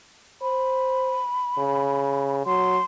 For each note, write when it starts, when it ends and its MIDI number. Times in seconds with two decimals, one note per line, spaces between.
0.42 1.20 72
0.42 2.35 83
1.58 2.42 49
2.46 2.78 54
2.46 2.85 84